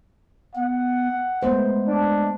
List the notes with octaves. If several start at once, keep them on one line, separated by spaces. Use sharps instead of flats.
B3 F#5
G#3 A3 B3 C5
D4